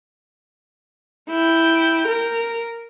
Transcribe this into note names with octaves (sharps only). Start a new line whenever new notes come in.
E4 G5
A#4